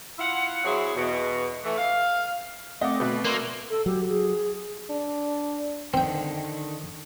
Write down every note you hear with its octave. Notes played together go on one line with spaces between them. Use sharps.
E4 F4 F#5
F#3 C4 E4 G#4
E2 B2
E3 A3
F5
A3 C4 D#5 F#5 D6
B2 A3 B4
A#3 D5 F5 C6 E6
A4
F#3 G4
G#4
D4
D3 D#3 C4 G5